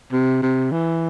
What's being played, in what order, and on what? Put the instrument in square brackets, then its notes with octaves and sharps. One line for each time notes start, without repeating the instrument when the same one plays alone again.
[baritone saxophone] C3
C3
E3